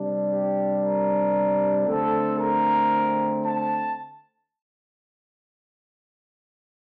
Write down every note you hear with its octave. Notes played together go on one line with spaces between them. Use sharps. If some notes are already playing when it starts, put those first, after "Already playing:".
Already playing: C3 G3 D4
G4
A#4
D3 A3 C4 A4
A#4
A5